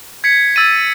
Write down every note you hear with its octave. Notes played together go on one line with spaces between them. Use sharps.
G#6 B6 C#7
E6 A6 D#7